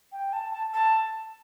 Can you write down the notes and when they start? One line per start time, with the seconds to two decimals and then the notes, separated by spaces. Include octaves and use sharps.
0.12 G5
0.33 A5
0.52 A5
0.74 A5